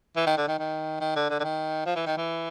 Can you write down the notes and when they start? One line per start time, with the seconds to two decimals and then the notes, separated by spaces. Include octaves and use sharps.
0.16 E3
0.27 D#3
0.37 D3
0.48 D#3
0.59 D#3
1.01 D#3
1.15 D3
1.30 D3
1.40 D3
1.44 D#3
1.86 F3
1.96 E3
2.06 D#3
2.17 E3